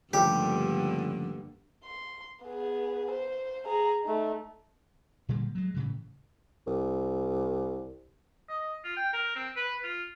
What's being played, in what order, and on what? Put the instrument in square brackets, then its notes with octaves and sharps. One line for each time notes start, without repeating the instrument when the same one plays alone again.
[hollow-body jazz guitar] C#2 F3 A3 [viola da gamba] G2 D3 A#3 [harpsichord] G4
[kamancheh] C6
B3 G#4
C5
G#4 A#5
A3 D#4
[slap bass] A#2 D3 G3 A#3
F#3 G#3
A2 C#3 E3
[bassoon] C2
[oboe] D#5
F4
G5
A#4
C4
B4
F4